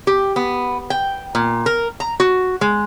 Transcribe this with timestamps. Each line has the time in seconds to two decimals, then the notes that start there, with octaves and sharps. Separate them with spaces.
0.07 G4
0.36 B3
0.90 G5
1.35 A#2
1.66 A#4
2.00 A#5
2.20 F#4
2.61 G#3